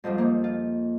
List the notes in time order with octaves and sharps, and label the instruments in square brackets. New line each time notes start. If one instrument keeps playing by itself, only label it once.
[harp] F2 G#2 F3 G3
A#3 D#4
F4